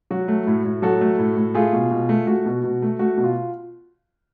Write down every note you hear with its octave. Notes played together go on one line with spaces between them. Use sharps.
F#3 F#4
A3
A2
A2
F#3 F#4 A4
A3
A2
A2
A3 F4 G#4
B2
B2
A3
A3 F#4
B2
B2
A3
A3 F#4
B2
F4